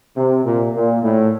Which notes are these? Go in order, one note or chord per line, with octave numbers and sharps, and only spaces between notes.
C3
A#2
A#2
A2